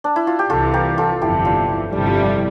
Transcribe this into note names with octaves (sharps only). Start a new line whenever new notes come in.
D4
E4
F4
G4
C2 C3 E3 F4 A4
G4 A#4
F4 A4
G1 F2 C3 E3 E4 G4
D4 F4
E4
G1 F2 C3 G3 D4
F4
E4